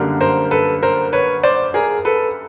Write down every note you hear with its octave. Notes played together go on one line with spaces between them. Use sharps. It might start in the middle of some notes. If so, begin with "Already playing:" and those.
Already playing: F#2 D3 G3 A#3
A#4 C5
A4 B4
A#4 C5
B4 C#5
C5 D5
G#4 A#4
A4 B4